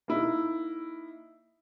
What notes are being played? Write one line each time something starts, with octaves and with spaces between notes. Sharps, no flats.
A#3 D#4 E4